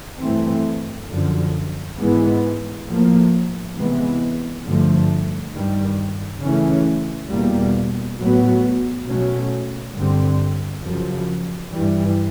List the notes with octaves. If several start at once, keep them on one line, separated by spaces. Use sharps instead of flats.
G2 E3 A3 C4
F#2 D3 F3
G#2 E3 G#3 B3
A2 F3 A#3
C3 E3 G#3 B3
G2 D3 F3 A3
G2 D#3 G3
C#3 E3 A3 C#4
E2 B2 G3 A#3
A2 F#3 B3
B2 F#3 A3 C#4
G2 D3 G3 C4
F#2 C#3 F3
G2 E3 G3